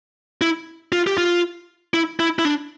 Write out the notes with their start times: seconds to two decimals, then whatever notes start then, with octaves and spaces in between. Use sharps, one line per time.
0.41 E4
0.92 F4
1.07 G4
1.18 F4
1.94 E4
2.20 E4
2.39 E4
2.45 D4